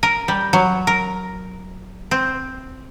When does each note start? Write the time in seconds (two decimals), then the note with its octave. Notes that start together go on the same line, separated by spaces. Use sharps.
0.03 A#4
0.28 G3
0.53 F#3
0.87 A#4
2.11 C4